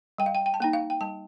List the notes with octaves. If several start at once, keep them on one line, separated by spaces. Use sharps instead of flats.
G3 G5
F5
G5
G5
A5
A#3 D#4 G5
F5
G5
G3 A5